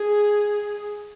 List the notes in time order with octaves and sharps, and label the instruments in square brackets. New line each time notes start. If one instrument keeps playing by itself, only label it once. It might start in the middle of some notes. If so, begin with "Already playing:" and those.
Already playing: [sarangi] G#4